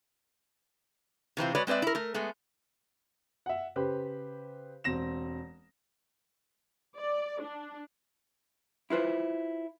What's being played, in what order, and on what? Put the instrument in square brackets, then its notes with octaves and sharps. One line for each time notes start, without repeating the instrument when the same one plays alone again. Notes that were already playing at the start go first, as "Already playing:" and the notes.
[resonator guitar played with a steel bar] C3 E3 C4 F4
G#3 F#4 B4 C#5 D5
G#3 C4 B4 D5 E5
E4 A#4
A3 A#4
G#3 A3 B3
[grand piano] E5 F#5
C#3 G4 B4 C5
E1 C4 A#6 E7
[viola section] D5
D4
[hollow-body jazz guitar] E4 F4 B4 C5